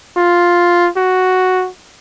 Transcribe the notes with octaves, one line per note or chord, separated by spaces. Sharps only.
F4
F#4